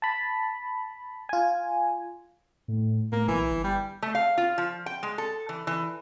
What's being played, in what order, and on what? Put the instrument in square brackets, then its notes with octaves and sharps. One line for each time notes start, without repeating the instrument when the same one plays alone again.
[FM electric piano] A5 B5
F4 G#5
[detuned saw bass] A2
[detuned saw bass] A2 [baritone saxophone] A#3
[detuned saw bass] B1 [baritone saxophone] E3
[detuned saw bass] G1
[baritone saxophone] G3
[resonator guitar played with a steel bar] A3
F5
F4
F3
G5
G#3
A4
E3
E3